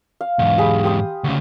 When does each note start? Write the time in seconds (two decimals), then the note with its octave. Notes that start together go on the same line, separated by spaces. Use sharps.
0.21 F5
0.39 E2 G#2
0.58 G4 G#4 B5
0.83 G4 C6 D#6
1.24 D2 C#3